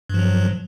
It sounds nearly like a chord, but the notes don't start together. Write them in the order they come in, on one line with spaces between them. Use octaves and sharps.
G2 F3 F#3